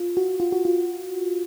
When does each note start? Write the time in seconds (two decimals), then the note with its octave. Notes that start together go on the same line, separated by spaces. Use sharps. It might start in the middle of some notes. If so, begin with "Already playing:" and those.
Already playing: F4
0.17 F#4
0.40 F4
0.52 F#4
0.65 F4